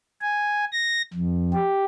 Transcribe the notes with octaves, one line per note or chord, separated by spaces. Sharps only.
G#5
A#6
F2
G4